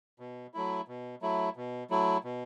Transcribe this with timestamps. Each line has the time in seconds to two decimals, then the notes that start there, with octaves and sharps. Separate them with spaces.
0.19 B2
0.54 F#3 A3 E4
0.88 B2
1.22 F#3 A3 E4
1.56 B2
1.90 F#3 A3 E4
2.24 B2